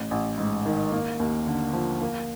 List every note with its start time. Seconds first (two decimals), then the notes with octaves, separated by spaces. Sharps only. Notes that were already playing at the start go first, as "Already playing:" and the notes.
Already playing: A1
0.11 A1
0.38 G#2
0.66 D#3
0.92 A#3
1.20 D#2
1.47 D3
1.73 F3
2.01 A#3